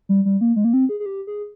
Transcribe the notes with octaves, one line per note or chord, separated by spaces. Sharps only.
G3
G3
A#3
G#3
A#3
C4
G#4
G#4
G4
G#4